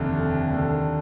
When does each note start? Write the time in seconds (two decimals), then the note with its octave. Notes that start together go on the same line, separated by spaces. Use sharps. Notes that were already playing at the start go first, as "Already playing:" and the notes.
Already playing: F1 D#2 D3
0.51 D#2 D3